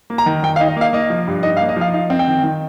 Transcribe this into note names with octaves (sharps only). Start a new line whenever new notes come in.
A#3
A#5
D#3
D#3 G5
F5
D#4
D#5
A#3 F5
A#3 D#5
F3
G2
D#4 D#5
F5
A#3
D#5
F3 F5
D#4 F5
C4
G5
D#3
D#3